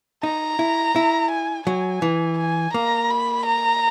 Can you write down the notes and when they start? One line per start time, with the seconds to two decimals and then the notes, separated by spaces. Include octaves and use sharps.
0.23 D#4 A#5
0.59 E4
0.96 E4
1.31 G#5
1.67 F#3 G#5
2.02 E3
2.38 G#5
2.74 A#3 A#5
3.10 B5
3.46 A#5